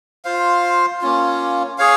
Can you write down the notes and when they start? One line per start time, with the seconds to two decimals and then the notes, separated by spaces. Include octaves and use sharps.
0.25 F4 C5 F5
1.02 A#3 C#4 F4
1.78 G#4 C#5 F5